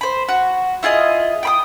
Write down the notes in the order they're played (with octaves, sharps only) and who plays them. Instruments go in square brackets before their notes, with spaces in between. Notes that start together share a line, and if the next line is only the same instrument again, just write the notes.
[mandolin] C5 B5
F#4
E4 F4 G#4 D#5
G5 B5 D#6